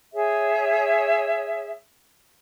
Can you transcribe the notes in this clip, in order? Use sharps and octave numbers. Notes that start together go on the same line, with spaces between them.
G#4 C#5 E5